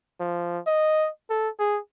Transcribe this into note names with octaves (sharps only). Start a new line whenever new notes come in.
F3
D#5
A4
G#4